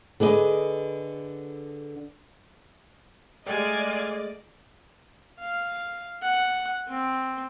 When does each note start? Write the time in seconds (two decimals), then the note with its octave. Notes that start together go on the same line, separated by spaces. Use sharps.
0.20 D3 G#4 B4 D#5
3.46 G#3 A3 G4 D5 D#5 F5 G#5
5.39 F5
6.22 F#5
6.88 C4